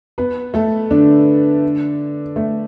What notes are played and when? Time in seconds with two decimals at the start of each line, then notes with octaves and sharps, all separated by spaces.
0.18 B3 B4
0.54 A3 A4
0.91 D3 D4
2.36 A3